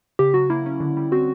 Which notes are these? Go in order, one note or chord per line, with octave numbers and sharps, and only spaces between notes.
C#3 G4
F#3 F#4
A#3 E4
C#4
D3
G3
C4 F#4